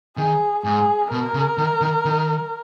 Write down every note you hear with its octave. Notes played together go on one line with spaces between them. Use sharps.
D#3 G#4
G#2 G#4
B2 A#4
C#3
D#3
D#3
D#3